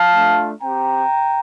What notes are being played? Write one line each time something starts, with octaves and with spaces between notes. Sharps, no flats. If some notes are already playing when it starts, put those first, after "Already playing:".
Already playing: F5 A5
A3 D4 F4
C4 G4 G5 A#5